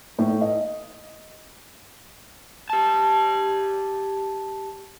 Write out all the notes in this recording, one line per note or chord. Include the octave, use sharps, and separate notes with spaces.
A2
D#5
G4 A5